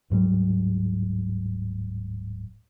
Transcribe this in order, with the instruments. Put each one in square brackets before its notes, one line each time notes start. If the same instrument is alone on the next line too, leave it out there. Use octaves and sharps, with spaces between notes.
[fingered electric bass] D1 G#2 F#3 G3